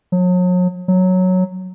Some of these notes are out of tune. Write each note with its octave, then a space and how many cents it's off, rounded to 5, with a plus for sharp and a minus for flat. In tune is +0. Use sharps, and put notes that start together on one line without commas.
F#3 -40
F#3 -5